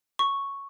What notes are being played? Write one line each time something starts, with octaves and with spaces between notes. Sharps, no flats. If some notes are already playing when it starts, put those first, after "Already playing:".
C#6